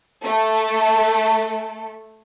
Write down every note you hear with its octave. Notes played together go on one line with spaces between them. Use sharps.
A3 A4